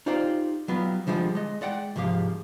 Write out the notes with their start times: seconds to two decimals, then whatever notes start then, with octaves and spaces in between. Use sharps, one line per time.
0.06 D#4 F4 G4 C5 D5
0.68 F#3 G3 B3 F4
1.07 D3 F3 G3 G#3
1.35 G#3 D#5
1.61 G#3 D5 F#5 G5
1.96 C2 G#2 F3 G4 F5